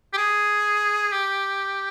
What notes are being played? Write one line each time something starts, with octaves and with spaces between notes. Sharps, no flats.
G4
G#4
G4